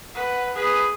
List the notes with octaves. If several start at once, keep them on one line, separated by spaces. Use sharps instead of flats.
B4 F#5
G#4 B4